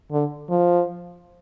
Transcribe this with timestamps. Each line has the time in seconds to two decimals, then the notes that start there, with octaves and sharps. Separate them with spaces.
0.11 D3
0.49 F3